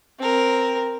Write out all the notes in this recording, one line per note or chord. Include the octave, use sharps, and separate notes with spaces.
C4 A#4